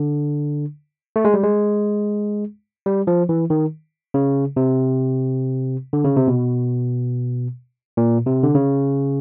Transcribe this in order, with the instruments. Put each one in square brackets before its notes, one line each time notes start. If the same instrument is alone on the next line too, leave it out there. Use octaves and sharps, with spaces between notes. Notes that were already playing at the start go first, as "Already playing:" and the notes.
Already playing: [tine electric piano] D3
A3
G#3
G3
G#3
G3
F3
E3
D#3
C#3
C3
D3
C#3
C3
B2
A#2
C3
D3
C#3